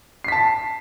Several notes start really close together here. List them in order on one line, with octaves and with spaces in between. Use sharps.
C7 B6 A5